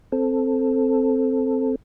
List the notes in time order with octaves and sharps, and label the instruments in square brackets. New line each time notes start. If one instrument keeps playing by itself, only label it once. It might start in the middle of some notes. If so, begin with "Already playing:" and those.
[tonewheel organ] C4 A4